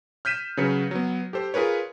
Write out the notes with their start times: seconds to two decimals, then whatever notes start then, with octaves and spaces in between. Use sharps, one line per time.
0.25 F6 G6 B6 D#7 E7
0.57 C#3 F#3 B4 C#7
0.91 F#3 B3
1.33 G4 A4 C5
1.54 F4 G#4 A#4 B4 C#5